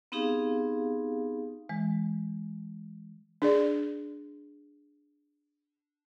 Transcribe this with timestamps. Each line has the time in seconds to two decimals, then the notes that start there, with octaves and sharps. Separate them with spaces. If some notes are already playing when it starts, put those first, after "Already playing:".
0.12 B3 C4 D#4 G4 G#4 F5
1.69 E3 G#3
3.42 D4 G#4 D5